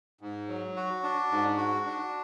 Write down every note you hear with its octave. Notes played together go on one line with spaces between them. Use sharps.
G#2
F#3
F#4
D4
G#2
F#4
D4